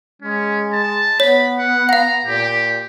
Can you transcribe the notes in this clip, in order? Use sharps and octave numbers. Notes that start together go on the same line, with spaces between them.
G#3 C#4
A5
B3 C#5 B5
F#5
F5 F#5 A#5
A#2 G4